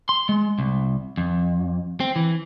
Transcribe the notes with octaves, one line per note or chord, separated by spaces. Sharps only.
C6
G#3
C2
F2
C4
E3